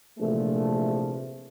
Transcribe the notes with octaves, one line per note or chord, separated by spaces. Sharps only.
A#1 C3 E3 F3 A3